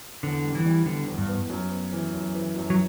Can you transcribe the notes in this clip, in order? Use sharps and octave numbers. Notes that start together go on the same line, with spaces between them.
E2 D3
G3
E3
G3
D3 B3
E2
G2
B3
F#2
B3
E3
F#2
E3
F#2
F#3